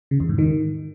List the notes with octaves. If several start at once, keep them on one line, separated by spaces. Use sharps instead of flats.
C#3
E2
G#2
D#3